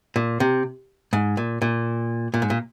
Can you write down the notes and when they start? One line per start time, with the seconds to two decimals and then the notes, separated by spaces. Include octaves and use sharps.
0.16 A#2
0.40 C3
1.13 G#2
1.37 A#2
1.62 A#2
2.34 A#2
2.42 G#2
2.50 A#2